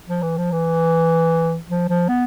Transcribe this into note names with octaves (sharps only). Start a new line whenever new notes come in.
F3
E3
F3
E3
F3
F3
B3